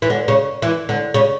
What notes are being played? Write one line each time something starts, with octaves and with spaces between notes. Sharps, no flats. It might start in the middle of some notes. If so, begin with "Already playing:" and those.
E3
D3
C#3
E3
D3
C#3